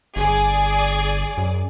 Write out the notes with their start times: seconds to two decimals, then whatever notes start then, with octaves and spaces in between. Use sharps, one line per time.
0.16 G1 G#4 D5
1.38 F#2